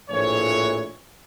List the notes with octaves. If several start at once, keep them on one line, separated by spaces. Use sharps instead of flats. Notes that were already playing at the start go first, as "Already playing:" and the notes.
A#1 A2 E3 F3 C#5